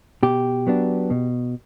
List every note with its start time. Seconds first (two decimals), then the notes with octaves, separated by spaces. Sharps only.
0.23 B2 G4
0.67 F#3 B3 D4
1.10 B2